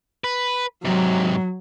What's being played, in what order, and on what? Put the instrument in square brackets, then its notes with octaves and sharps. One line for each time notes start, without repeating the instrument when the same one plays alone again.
[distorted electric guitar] B4
[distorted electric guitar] G#2 C3 [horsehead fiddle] F#3